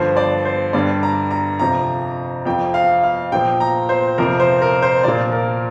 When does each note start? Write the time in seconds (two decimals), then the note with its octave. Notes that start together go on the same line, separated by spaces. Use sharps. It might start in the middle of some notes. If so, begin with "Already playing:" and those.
Already playing: G2 D3 F3 C5
0.17 D5
0.45 C5
0.73 G2 D3 G3 D5
1.03 A#5
1.31 A#5
1.59 F2 C3 F3 A#5
2.45 F2 F3 G5
2.74 F5
3.03 F5
3.32 A#2 F3 G5
3.60 A#5
3.89 C5
4.18 F2 C3 F3 A#4
4.40 C5
4.62 A#4
4.82 C5
5.03 A#2 F3 D5
5.32 A#4